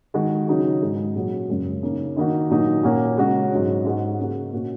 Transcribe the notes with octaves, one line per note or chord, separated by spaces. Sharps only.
D#3 G#3 F#4
C#3 F#3 D#4 F#4
G#2 G#3 F#4
A#2 F#3 C#4 F#4
F#2 C#3 G#3
C#3 A#3 D#4
D#3 A#3 D#4 F#4
A#2 F#3 D#4 F#4
A#2 A#3 C#4 F#4
C#3 G#3 C#4 F#4
G#2 F#3 C#4
G#2 G#3 C#4 F#4
C#3 A#3 F#4
A#2 A#3 C#4 F#4